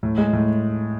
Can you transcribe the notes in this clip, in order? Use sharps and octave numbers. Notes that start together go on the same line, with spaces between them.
A2
G#3
A2